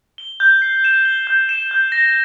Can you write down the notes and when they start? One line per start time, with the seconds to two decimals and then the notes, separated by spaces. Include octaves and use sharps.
0.18 G7
0.40 G6
0.62 C7
0.84 E7
1.05 G7
1.27 G6
1.49 E7
1.71 G6
1.92 A#6